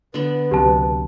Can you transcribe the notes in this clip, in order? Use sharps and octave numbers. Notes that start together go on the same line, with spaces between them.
D3 B3 B4
C#2 C3 F#3 G4 A5